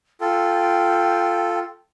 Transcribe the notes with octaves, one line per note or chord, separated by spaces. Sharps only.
F4 A4 G5